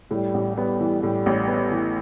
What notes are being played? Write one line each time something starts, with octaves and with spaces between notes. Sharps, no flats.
A2 G3
A1
G3 B3
E3
A2 G3
A1
B3
E3